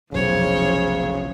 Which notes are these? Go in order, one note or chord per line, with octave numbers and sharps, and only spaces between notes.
F1 B1 C#3 F3 F#3 C5 C#5